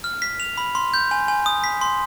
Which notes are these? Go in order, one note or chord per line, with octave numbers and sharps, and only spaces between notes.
F6
B6
F7
B5
C6
G6
G#5
G#5
D#6
B6
C6